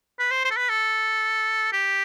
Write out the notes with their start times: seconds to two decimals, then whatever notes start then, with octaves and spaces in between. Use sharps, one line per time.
0.19 B4
0.31 C5
0.44 C5
0.51 A4
0.57 B4
0.69 A4
1.72 G4